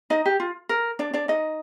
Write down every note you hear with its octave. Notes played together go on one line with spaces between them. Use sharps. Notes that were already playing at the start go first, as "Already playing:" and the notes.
D#4 D#5
G4
F4
A#4
D4 D5
D4 D5
D#4 D#5